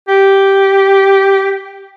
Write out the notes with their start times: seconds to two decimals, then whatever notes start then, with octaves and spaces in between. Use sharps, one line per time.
0.08 G4